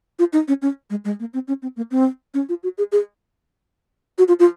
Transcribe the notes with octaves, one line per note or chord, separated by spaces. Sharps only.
F4
D#4
C#4
C#4
G#3
G#3
A#3
C4
C#4
C4
A#3
C4
C#4
F4
F#4
G#4
G#4
F#4
F4
F4